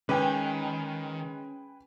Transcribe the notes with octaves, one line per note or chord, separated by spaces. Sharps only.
D#3 G#3 C#4 B4 G5 G#5